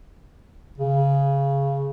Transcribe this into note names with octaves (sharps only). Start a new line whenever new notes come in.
C#3